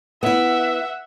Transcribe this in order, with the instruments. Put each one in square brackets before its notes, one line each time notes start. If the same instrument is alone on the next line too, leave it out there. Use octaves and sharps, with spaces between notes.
[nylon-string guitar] B3 E4 [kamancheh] E5 F#5